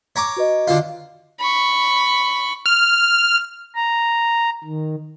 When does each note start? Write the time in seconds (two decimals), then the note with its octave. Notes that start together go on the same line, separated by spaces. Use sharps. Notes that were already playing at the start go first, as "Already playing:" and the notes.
0.16 C#5 A#5 D6
0.37 F#4 B4 D#5
0.68 D3 F4
1.40 B5 C#6
2.66 F6
3.75 A#5
4.64 D#3